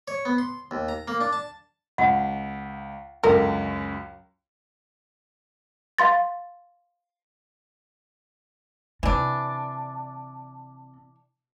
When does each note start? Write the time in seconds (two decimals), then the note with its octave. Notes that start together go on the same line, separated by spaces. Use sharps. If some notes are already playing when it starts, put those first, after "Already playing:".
0.08 C#5
0.25 B3
0.38 C6
0.71 D#2
0.88 A#5
1.08 A#3
1.20 D4
1.33 A5
1.98 C#2 F#5
3.23 C#2 F#2 D3 A#4
5.98 F5 C6 A6
9.03 C3 E3 D4